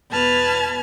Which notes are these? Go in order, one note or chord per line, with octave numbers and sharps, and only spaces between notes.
E2 B2 B4 A5 F6 G#6